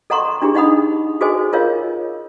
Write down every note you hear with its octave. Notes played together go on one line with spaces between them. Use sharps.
A4 D#5 F#5 A#5 C6 C#6
D4 E4 G4 G#4
D#4 D#5 F#5 B5 D#6
F#4 G#4 A4 C5 D#5 G#5
F4 A#4 C#5 D#5 F5